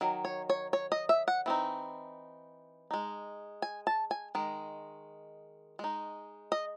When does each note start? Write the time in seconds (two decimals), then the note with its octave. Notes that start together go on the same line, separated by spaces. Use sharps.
0.01 D#3 F#3
0.25 C#5
0.50 C#5
0.73 C#5
0.92 D#5
1.09 E5
1.28 F#5
1.46 E3 C4 D#4
2.91 G#3 D#4
3.62 G#5
3.87 A5
4.11 G#5
4.35 D#3 G#3
5.79 G#3 D#4
6.52 D#5